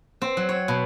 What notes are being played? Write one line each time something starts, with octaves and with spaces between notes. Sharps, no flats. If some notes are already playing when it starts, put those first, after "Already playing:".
C4
F#3
C#5
B2